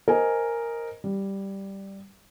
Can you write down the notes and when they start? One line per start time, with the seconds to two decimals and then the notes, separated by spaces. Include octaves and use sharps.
0.08 A#4 C5 D#5 G#5
1.04 G3